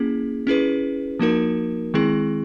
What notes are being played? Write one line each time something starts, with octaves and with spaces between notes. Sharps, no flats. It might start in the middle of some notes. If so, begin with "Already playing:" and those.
Already playing: A#3 C#4 E4 G#4
C#4 E4 G#4 B4
F3 A#3 D#4 F#4 A#4
D#3 G#3 C4 E4 G#4